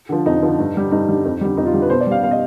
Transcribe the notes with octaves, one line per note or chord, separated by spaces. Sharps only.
D3 F3
F2 D#4
D3 F3
G2
D3 G3
G2 D#4
D3 G3
F2
D3 G3
F2 D#4
F4
D3 G3
B4
B2 C5
D5
G3 F5
B2 F5
D#5